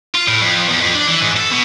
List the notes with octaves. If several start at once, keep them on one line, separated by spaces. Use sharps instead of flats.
F4
A2
F2
E2
F2
D4
E3
G#2
A4
B2